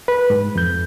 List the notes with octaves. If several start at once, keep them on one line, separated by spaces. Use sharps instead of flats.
B4
G#2
F2 G6